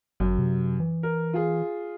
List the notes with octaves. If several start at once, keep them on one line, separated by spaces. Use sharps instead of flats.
G1 F#2
C3
E3
A#4
F4 G#4